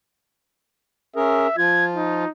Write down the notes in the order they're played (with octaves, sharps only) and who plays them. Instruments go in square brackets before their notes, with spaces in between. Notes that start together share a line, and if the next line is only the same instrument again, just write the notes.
[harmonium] C#4 G#4 A#4 [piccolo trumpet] E5
[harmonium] F3 F4 [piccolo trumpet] G#6
[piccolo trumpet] D#4